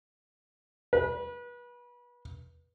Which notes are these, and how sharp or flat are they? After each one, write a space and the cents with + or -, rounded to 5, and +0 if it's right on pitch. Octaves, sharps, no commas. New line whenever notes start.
B4 -30